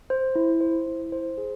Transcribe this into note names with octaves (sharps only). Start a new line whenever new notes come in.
C5
E4
C5
E4
C5
G#4